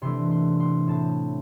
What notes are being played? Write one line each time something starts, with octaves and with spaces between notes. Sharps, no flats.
C3 E3 A3 D4 C6
C6
C6
A2 F#3 C4 A5